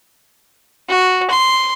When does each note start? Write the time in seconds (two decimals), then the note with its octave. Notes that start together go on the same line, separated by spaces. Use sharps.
0.89 F#4
1.31 C6